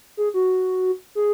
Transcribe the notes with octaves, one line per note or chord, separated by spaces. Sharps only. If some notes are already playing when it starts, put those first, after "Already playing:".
G#4
F#4
G#4